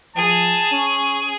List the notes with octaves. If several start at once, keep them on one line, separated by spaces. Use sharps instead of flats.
F3 G#4 A5
C#4